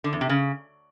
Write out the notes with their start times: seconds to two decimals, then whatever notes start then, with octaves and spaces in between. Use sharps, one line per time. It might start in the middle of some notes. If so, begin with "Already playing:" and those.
0.04 D3
0.13 E2
0.21 C3
0.29 C#3